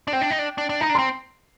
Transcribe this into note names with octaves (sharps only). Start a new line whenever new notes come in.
D4
C4 G5
D4
D#4
D4
D4
D4
D#4 A#5
D4
C4 C6